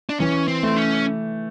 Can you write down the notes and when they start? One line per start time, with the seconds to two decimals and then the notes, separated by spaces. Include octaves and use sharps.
0.09 D4
0.20 E3 C#4
0.48 C4
0.63 A3
0.76 C#4